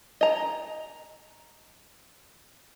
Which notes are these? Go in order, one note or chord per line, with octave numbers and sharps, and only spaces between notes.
D#5 A#5